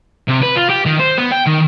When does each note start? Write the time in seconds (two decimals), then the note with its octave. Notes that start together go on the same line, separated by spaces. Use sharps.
0.28 C3
0.42 B4
0.56 F4
0.69 G4
0.86 D#3
1.00 C5
1.18 B3
1.32 G5
1.47 D#3